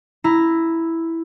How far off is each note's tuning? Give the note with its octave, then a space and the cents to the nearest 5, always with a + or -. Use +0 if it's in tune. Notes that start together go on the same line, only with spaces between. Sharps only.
E4 +0 A#5 +0